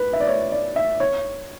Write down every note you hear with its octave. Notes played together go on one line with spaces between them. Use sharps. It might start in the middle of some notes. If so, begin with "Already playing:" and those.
Already playing: B4
E5
D5
C#5
D5
E5
C#5